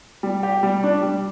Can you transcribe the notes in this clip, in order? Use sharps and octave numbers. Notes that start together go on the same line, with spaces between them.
G3
G4
G3
D4
G3